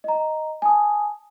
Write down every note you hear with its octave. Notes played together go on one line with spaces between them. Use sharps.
D#5 A#5
G#5 A5 D#6